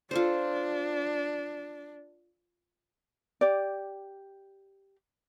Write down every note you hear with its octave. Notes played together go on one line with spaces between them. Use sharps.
D4 F4 A4 C5
G4 D5